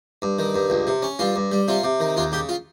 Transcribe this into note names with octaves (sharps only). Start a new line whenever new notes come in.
G2
D#3
G2
C#2
C3
C#4
G2 F4
G2
G3
C3 F4
C3
D#3
D#2 F4
C#3 G4
F4